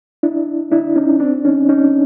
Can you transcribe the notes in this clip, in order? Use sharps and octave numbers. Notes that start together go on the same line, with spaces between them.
D4 E4
D4 E4
C#4 D#4
C4 D4
C#4 D#4
C#4 D#4